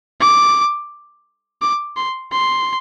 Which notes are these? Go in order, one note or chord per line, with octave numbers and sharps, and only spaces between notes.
D6
D6
C6
C6